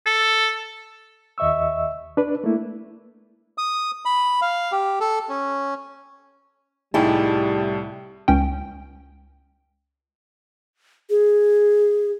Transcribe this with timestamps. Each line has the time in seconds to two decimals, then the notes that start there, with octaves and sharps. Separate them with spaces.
0.06 A4
1.38 D#2 D#5 E5 C#6 E6
2.17 D4 B4
2.44 A3 A#3 E4
3.58 D#6
4.05 B5
4.42 F5
4.72 G4
5.00 A4
5.29 C#4
6.94 C2 A2 G3 D#4 E4 G4 G#4 A5
8.28 C#2 C#4 G5
11.10 G#4